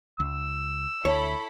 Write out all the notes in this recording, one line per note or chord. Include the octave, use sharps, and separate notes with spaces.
C#2 E6
D2 E4 A4 C#5 B5